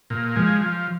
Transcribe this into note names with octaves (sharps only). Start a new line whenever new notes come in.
A#2
F3 G#3
F3